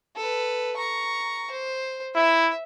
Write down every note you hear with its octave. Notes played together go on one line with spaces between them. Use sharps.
A4 B4
A#5 C#6
C5
E4 E5